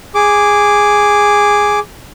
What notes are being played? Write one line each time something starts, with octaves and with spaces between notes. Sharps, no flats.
G#4 D6